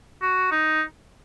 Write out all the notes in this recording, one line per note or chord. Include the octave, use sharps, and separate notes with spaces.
F#4
D#4